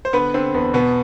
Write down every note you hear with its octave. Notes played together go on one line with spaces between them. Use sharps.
C5
D3 B3 B4
D3 C4
E2 B3
B2 B3